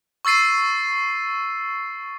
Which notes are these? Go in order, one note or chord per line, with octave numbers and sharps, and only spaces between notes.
C#6 E6 A6 C7 D#7